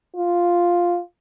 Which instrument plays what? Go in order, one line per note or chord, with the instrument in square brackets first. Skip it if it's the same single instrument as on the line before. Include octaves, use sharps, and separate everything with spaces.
[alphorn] F4